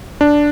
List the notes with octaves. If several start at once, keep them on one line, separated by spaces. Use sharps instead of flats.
D4